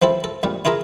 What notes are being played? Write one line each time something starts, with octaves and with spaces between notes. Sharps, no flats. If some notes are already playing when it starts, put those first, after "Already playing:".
F3 C4 E4 A4
A4
A#1 A#2 G3
E4 F4 G#4 A#4 E5